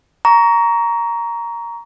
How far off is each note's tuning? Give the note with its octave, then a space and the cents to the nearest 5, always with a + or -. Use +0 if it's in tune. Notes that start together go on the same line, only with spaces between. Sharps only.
A#5 +5 C#6 +30